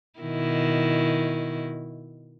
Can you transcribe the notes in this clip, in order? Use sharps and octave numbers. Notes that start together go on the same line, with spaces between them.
B2 D#3 E4